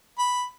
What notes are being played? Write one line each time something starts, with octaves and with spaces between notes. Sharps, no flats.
B5